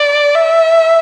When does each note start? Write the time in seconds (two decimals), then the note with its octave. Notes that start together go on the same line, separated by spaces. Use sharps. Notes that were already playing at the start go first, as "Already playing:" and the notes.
Already playing: D5
0.35 E5